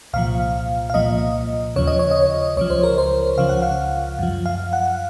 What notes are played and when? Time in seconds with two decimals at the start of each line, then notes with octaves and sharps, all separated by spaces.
0.13 C2 A#2 F3 F5
0.90 F5
0.94 C2 A#2 F3 D#5
1.76 D#2 C#3 F3 C#5
1.87 D#5
1.99 C#5
2.11 D#5
2.22 C#5
2.57 C#2 C#3 F3 C#5
2.70 C5
2.83 A#4
2.98 C5
3.38 C#2 C#3 F3 F5
3.49 F#5
3.62 F5
4.19 F#2 F3
4.46 F5
4.73 F#5